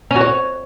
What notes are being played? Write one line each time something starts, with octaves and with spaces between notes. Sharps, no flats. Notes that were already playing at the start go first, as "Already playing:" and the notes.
C#4
F#4
C#5